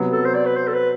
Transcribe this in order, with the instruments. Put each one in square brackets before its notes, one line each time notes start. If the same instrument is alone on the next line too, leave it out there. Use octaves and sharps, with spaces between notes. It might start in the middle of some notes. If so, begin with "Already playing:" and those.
Already playing: [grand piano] C3 F#3 B3
[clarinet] A4
C5
D5
B4
C5
A4
B4